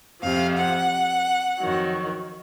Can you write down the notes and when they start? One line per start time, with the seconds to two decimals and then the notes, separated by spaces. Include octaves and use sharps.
0.22 F2 C3 F3 F5
0.57 F#5
1.59 F2 D#3 F#3